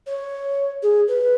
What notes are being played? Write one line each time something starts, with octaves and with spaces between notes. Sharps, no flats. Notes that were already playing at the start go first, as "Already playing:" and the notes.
C#5
G#4
B4